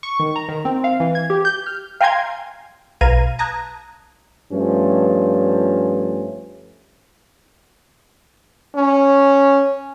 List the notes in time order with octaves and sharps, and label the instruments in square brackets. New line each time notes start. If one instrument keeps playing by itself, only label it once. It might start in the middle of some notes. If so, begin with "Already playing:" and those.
[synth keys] C#6
D#3
A#5
D#3
C4
F5
E3
G#6
G4
G6
F6
[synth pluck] F5 G5 G#5 A#5 C6 G#6
B1 B4 F5 A#5 G#6 D#7
A5 A#5 D#6 F#6 G#6
[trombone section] G2 F3 A3 C#4
[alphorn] C#4